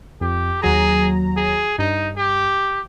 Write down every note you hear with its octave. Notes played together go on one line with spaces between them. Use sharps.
F2 G4
D#2 F#3 G#4 A#5
G#4
G2 D#4
G4